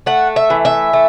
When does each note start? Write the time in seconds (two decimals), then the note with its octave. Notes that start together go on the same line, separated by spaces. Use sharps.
0.06 A3 F#5
0.36 E5
0.50 E3
0.65 E5
0.93 A3